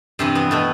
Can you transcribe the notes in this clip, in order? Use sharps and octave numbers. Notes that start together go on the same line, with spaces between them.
G2 C3 E3 C4
B3
B2 A3